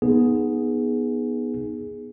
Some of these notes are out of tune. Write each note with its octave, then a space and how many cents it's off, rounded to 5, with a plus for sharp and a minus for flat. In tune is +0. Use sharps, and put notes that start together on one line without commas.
B3 -20 D#4 +0 G#4 +0